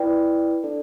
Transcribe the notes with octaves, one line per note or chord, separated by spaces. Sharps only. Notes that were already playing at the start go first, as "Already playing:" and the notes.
Already playing: E4 B4 D5 G5
D4 A4 D5